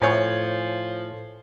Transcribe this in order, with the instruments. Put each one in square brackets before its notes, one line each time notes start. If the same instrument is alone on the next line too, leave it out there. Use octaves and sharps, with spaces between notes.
[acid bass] A2 [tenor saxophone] F3 [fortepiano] C#5 G#5